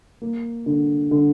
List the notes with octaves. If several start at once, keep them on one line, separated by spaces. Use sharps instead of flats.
A#3
D3
D3